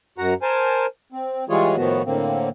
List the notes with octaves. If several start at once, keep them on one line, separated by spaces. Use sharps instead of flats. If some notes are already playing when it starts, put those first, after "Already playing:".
F#2 F#4 F#5 A#5
A#4 C5 G#5 A5
C4
E3 G3 G#3 F4 G#4 C#5
A2 D#3 F3 B3 F#4
A2 D3 A#3 C4